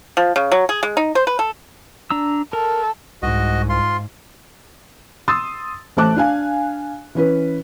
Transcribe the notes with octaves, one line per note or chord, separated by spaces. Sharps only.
F3
C#3
F#3
G#4
G#3
D#4
C5
B4
A4
D4 A#5 E6
A4 A#4
C2 G#2 F#4 D#5
F4 C6
C6 D#6 E6 A6
A1 A3 C5 A5 D6 F#6
D4 F5 G#5
E3 C#4 B4